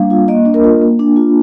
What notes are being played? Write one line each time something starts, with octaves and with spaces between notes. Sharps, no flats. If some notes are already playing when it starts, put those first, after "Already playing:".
Already playing: G3 A#3 D4 F5
F4
A#3 D#5
D4
A#4
F4
A#3
D4
F4